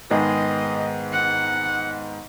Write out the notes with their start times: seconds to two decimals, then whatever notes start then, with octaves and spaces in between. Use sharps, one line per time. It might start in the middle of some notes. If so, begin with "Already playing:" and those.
0.10 G#2 D#3 G#3 B3 G#4 D#5
1.13 F#5